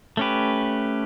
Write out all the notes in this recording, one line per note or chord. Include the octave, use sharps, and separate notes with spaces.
A3 C#4 G4 B4